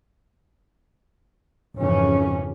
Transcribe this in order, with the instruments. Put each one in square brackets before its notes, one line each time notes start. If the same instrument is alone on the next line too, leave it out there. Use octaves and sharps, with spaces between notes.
[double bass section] G#1 F2 C#3 E3 C#4